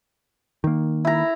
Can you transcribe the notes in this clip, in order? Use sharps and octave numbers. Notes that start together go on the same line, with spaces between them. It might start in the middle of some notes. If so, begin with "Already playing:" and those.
D#3 A#3
E4 A#5